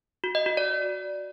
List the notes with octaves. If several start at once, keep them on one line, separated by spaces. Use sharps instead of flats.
F#4
D#5
F#4
D5